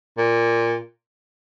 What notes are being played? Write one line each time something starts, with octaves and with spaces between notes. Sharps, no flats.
A#2